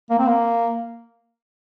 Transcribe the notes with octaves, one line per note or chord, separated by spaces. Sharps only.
A#3
C4
A#3